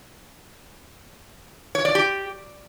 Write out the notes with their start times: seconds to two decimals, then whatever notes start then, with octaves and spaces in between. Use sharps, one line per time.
1.75 C#5
1.85 D5
1.95 G4